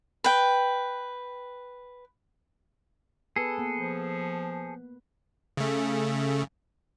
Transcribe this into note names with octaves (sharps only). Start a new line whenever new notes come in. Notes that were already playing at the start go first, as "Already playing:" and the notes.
B4 G5
B3 G#4 A4 B4
A#3 B3
F3
C#3 A3